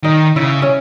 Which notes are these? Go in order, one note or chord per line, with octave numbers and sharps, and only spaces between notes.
D#3 D#4
C#3 E4
C#4